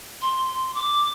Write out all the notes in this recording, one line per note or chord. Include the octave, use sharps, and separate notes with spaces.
C6
D6